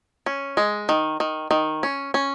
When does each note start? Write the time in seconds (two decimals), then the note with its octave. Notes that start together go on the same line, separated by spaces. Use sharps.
0.26 C#4
0.57 G#3
0.89 D#3
1.20 D#3
1.51 D#3
1.83 C#4
2.14 C#4